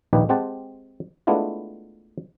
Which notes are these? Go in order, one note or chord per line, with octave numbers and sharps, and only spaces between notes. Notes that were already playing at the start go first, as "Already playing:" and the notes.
A#1 D#2 A#2 D#4 G4 B4
G#3 C4 G4 F#5 A5
G#3 A3 B3 D4 E4 F4